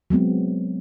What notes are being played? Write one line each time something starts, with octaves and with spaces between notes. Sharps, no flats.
F#3 G#3 B3 C4